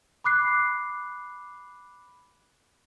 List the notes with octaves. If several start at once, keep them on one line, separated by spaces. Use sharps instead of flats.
B5 D6 F#6 C7